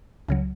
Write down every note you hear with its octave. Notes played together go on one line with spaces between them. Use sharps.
C#2 C#3 F#3